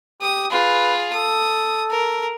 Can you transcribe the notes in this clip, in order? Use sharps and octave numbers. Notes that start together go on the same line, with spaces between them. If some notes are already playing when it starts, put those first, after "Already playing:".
G4 D#6
F4 G#4 B4
A4 D#6
A#4